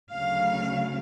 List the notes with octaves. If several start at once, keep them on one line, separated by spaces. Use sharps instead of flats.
D2 C#3 F#3 F5